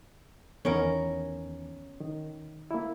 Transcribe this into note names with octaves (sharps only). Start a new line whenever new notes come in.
E2 D#3 B3 C#4 A#4
D#3
A#3 E4